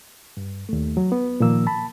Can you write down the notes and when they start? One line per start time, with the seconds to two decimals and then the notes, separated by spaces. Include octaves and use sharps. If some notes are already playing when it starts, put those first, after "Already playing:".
0.37 G2
0.69 D#2 A3
0.97 F#3
1.12 B3
1.40 A#2 D#3 F3 A#3 E6
1.67 A5 B5